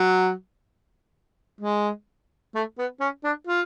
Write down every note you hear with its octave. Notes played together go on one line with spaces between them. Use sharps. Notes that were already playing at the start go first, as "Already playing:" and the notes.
Already playing: F#3
G#3
A3
B3
C#4
D4
F4